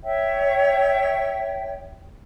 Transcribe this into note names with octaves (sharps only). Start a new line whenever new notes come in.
C#5 E5 G5